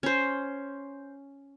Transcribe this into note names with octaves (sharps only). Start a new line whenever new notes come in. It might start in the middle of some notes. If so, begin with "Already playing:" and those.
C#4 C5